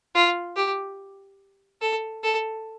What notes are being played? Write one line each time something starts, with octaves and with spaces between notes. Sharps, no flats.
F4
G4
A4
A4